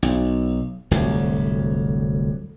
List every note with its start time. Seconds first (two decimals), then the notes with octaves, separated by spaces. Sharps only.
0.03 B1
0.91 D1 C2 F2